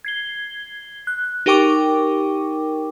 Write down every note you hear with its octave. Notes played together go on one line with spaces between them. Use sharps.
G#6 C7 G7
F#6
D#4 G4 A#4 G5 C#6 D6